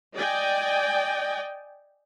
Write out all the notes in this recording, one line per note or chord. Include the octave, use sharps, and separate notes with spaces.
D5 D#5 G5 G#5